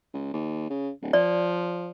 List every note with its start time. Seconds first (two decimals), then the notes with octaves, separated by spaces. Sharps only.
0.14 C#2
0.33 D#2
0.70 C#3
1.02 D1
1.13 F3 D5